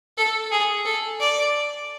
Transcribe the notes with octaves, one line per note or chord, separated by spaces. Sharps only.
A4
G#4
A4
D5